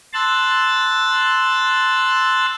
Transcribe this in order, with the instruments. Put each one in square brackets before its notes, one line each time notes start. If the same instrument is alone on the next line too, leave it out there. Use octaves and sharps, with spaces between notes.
[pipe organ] A5 C6 E6 F#6 A6